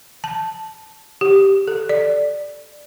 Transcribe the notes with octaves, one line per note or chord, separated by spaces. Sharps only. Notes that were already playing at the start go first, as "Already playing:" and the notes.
A5
G4
A4
D5